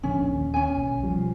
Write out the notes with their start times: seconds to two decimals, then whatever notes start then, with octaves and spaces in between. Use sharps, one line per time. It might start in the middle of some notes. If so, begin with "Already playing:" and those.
0.03 D1 A#1 D3 C#4
0.32 D#2
0.54 C#4 G#5
0.77 B1
1.03 B1 F3 G3